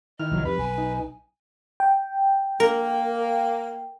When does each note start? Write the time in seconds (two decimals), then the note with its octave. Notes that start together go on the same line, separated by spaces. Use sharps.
0.19 D#3 E4 D#5 F6
0.32 C2 F3 F#3
0.45 F2 G4 B4 B5
0.58 B1 G#5
0.78 D#4
1.80 G5
2.60 A#3 A#4